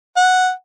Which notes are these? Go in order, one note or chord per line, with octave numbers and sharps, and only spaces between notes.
F#5